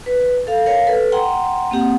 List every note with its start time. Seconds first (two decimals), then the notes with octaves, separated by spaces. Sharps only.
0.06 B4
0.47 A4 F5
0.66 A#4 C#5 F5
0.87 A4 B4
1.12 F#5 G5 A#5 C6
1.71 A#3 C4 G4 F#5